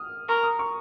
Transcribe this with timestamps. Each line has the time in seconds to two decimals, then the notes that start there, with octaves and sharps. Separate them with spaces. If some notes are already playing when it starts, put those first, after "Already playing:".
Already playing: D#6 F6
0.29 A#4 C#6
0.43 D#6
0.59 C#6